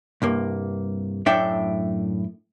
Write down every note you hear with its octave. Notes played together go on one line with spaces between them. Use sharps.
C2 G2 A#3
F#2 A2 D4 E5 G5